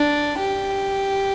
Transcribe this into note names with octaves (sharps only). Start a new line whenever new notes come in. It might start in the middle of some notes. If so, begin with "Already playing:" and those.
Already playing: D4
G4